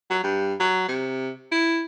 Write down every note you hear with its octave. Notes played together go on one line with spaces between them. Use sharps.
F#3
G2
F#3
C3
E4